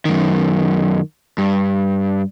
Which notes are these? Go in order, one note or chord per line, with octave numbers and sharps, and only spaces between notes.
F#2 D#3
G2